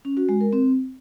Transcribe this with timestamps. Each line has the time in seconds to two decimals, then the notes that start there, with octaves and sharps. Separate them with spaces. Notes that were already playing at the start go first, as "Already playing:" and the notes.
0.05 C#4
0.17 F#4
0.29 G#3
0.41 A#4
0.53 C4